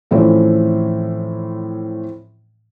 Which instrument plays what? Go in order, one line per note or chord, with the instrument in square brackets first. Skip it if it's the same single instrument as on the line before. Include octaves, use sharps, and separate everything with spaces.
[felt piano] A2 E3 F3 A3 C4 C#4